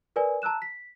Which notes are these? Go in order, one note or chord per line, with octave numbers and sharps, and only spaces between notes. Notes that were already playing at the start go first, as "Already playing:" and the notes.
A#4 B4 D5 G#5
A5 A#5 E6 F#6 E7
B6